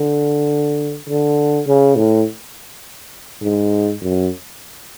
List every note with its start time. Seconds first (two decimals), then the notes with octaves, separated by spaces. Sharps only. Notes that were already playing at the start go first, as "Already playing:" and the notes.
Already playing: D3
1.09 D3
1.67 C#3
1.96 A2
3.43 G#2
4.02 F#2